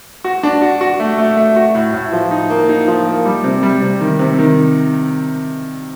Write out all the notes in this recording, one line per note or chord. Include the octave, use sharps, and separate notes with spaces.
F#4
D4
F#4
F#4
A3
A3
A3
F#4
A2
A2
F3
D#4
A#3
D#4
F3
A#3
G3
C3
G3
C3
D#3
C3
D#3